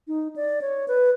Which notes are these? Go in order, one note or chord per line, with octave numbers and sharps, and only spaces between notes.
D#4
D5
C#5
B4